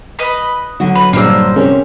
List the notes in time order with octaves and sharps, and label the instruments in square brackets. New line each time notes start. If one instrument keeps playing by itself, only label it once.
[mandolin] B4 D#5 B5
[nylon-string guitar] D3 F#3 F#4
[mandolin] B4
[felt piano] A#1 G2 [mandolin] A#3 C5 E6
[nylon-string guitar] C3 C#4 [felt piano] A#4